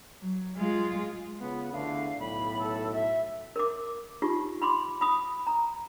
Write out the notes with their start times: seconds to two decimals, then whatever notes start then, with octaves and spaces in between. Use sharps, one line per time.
0.20 F#3
0.56 G#3 F4
1.41 C#3 B3 F4
1.72 E2 D3 A3 F5
2.19 B1 A2 B5
2.59 A4
2.91 E5
3.56 A#4 D6
4.22 D#4 F4 G4 C#6
4.62 B5 C6 D6
5.01 B5 D#6
5.47 A#5